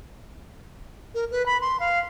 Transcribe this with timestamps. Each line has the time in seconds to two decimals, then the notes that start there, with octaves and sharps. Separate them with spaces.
1.15 A#4
1.31 B4
1.46 B5
1.61 C6
1.80 F5